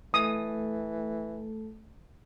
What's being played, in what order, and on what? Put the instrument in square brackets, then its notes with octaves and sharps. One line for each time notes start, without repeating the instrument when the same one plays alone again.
[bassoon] E3 [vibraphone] A3 A4 [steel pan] D#6